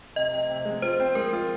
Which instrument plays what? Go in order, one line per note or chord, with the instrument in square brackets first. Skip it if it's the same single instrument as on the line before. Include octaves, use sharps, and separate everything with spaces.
[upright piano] C3 [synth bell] D#5
[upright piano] C3
C3
G#3
[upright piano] F4 [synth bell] C5
[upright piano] C4
[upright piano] G#3 [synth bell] A#4
[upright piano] F4